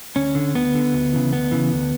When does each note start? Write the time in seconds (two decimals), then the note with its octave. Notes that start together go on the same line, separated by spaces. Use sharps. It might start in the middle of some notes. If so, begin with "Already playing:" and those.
0.16 D2 C#4
0.35 D3
0.55 D2 B3
0.75 D3
0.94 D2
1.13 C#3 E3
1.32 D2 B3
1.52 C#3 E3
1.72 D2